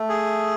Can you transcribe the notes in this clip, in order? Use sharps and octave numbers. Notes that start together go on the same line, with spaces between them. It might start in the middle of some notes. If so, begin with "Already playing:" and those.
Already playing: A3
G#4